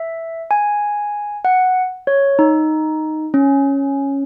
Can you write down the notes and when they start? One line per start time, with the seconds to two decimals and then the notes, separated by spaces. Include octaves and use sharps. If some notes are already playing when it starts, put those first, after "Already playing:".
Already playing: E5
0.51 G#5
1.45 F#5
2.07 C#5
2.39 D#4
3.34 C#4